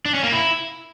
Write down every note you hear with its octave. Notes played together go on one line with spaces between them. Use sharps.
D4
C#4
A#3
E4